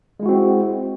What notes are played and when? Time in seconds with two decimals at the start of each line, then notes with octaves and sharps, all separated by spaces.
0.20 G#3
0.23 E4
0.26 F#4
0.29 C4